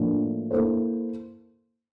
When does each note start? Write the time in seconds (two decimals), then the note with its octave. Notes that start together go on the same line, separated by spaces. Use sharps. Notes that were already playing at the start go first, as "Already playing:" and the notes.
Already playing: A2 F3 A#3 D4
0.51 A#3 E4 A4 C5